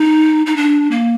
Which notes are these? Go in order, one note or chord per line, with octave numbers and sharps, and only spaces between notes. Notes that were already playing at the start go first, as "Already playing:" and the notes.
Already playing: D#4
D#4
D4
A#3